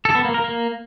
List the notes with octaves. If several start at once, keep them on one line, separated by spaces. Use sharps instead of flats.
A4
B3
A#3
A#4
A#3